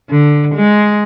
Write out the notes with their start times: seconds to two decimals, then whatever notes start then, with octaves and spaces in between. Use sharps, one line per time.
0.10 D3
0.55 G#3